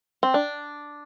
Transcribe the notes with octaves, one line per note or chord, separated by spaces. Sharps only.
C4
D4